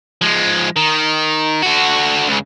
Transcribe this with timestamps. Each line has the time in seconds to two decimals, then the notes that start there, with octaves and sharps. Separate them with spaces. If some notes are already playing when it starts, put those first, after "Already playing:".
0.21 F3 G#3
0.76 D#3
1.63 D3 F#4
2.28 C#2 C#3